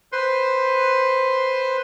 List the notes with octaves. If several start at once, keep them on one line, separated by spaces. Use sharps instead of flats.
B4 C5 C6